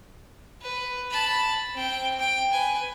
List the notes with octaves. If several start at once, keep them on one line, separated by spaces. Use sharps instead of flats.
B4
A5 B5
C4 G5
G5
B4 G#5